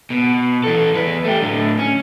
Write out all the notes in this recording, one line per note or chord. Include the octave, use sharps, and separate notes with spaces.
B2
E3 A4
E2 B4
A3 G4
A2 D3
C#4